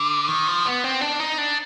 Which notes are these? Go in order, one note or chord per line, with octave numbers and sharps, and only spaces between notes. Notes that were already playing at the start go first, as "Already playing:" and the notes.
Already playing: D3
D#3
F3
B3
C4
D4
D#4
D4